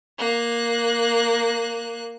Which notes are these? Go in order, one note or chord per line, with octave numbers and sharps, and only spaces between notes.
A#3 F#6